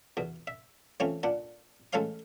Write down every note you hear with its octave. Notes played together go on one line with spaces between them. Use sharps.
E2 B2
E5
E3 A3 C4 C#4 F4
A#2 D4 F#5
A1 G#3 A4 C#5 F5 C6